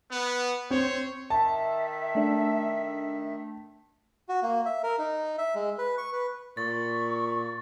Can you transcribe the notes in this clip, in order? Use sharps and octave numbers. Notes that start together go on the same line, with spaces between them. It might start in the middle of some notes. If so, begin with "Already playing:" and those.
B3
C4 C5 C#5
D#3 E5 A5
A3 D4
F#4
A#3
E5
A#4
D#4
E5
G#3
B4
C#6
B4
A#2 C#6 A6